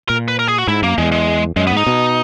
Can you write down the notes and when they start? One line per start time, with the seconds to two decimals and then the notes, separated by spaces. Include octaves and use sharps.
0.09 A#2 A#4
0.28 B4
0.39 A#4
0.48 G#4
0.58 F#4
0.68 G#2 E4
0.82 F#2 A#3
0.98 E2 G#3
1.12 G#3
1.56 F#2 G#3
1.67 B3
1.72 G#2
1.77 D#4
1.87 B2